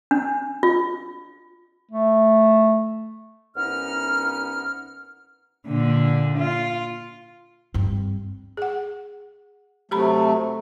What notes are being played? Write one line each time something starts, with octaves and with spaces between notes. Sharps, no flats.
D4
F4
A3
C2 B3 C#4 D#4 F6
A#2 D3
F4
G2 C4
G#4 F#5
C3 F#3 A3 G4 A#5 B5